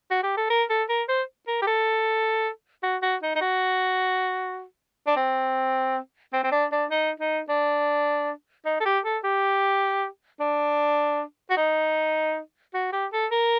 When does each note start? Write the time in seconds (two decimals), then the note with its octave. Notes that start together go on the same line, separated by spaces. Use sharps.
0.11 F#4
0.23 G4
0.37 A4
0.50 A#4
0.70 A4
0.89 A#4
1.09 C5
1.47 A#4
1.62 G4
1.67 A4
2.83 F#4
3.02 F#4
3.22 D#4
3.35 D#4
3.41 F#4
5.07 D4
5.16 C4
6.33 C4
6.43 C4
6.52 D4
6.72 D4
6.90 D#4
7.20 D#4
7.49 D4
8.65 D#4
8.80 A4
8.85 G4
9.05 A4
9.24 G4
10.40 D4
11.50 F#4
11.57 D#4
12.74 F#4
12.93 G4
13.13 A4
13.31 A#4